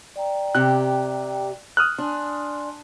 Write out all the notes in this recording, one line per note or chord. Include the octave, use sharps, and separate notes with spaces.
D5 G5 A#5
C3 G4 F#6
D#6 F6 F#6
D4 G#5 C6